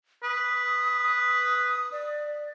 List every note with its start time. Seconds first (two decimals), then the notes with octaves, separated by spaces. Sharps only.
0.23 B4 D#6
1.92 D5